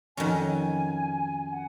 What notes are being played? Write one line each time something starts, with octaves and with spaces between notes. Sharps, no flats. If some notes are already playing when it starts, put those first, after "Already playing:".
F2 D#3 F#3 C#4 G#5
G#5
F#5